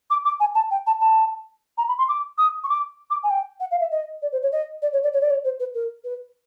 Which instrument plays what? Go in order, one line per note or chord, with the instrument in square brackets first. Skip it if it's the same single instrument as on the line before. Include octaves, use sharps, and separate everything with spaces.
[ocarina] D6
D6
G#5
A5
G5
A5
A5
A#5
B5
C6
D6
D#6
C#6
D6
D6
G#5
G5
F#5
F5
E5
D#5
D5
C5
C#5
D#5
D5
C#5
D5
C#5
D5
C#5
C5
B4
A#4
B4